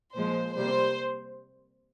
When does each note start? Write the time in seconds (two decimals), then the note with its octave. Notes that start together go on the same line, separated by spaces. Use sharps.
0.15 A#2 F3 G#3 C5
0.55 C3 G3 A#3 C5